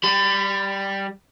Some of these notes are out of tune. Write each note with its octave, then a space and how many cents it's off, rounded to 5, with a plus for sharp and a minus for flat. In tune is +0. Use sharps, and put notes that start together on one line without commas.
G3 +0 B5 +40